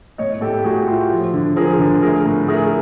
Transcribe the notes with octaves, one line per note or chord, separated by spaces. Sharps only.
A2 C#5 D#5
A2 G4 A4
A2 F#4 G#4
A3 F4 G4
F3
D3
F3 G#4 A#4
D3
A3 G#4 A#4
A2
A3 G#4 A#4